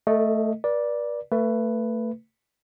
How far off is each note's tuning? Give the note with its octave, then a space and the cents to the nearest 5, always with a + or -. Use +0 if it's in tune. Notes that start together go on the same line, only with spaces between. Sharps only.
A3 +0 A4 +40 D#5 +0
B4 -45 D5 +0
A3 +30 B4 +0